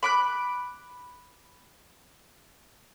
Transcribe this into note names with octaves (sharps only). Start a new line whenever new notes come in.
B5 D6 F#6